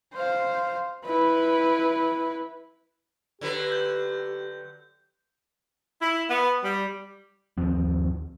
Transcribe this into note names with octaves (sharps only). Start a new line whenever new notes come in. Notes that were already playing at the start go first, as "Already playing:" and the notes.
C5 F5
E4 B4
D3 F#3 G4 B4
G6
E4
B3
G3
D#2 F3 C4